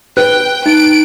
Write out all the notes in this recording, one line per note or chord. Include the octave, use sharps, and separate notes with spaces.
B4 G5 F#6
D#4 D7